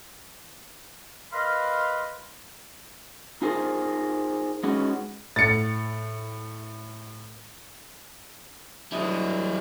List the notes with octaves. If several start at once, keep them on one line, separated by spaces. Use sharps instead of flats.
A#4 B4 D#5 F5 B5 C6
D#4 F4 G#4 A#4 C5
G#3 C#4 D#4 F#4 B4
A2 A6 C#7
F#3 G3 E4 D#5